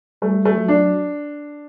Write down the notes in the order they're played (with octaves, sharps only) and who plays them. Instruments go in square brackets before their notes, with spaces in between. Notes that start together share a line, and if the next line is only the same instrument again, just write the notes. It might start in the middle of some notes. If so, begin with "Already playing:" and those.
[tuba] G3 [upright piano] A3
[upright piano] A3
[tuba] F#3
[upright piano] D4